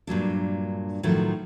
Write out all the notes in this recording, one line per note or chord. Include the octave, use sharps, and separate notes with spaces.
G2 A#2 F#3 D4
A2 D#3 F3 F#3